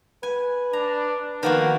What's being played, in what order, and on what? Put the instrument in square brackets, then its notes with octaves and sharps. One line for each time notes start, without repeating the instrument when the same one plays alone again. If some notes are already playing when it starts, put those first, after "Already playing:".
[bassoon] B4 [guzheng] G#5
[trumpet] D4 [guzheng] A#5
[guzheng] D#3 F3 F#4 [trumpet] A#3 [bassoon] B3